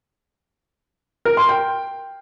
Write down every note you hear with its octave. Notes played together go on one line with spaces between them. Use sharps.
A#4
C6
G5